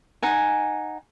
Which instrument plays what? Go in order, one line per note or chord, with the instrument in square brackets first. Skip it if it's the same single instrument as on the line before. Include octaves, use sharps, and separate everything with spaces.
[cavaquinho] D#4 F#5 G#5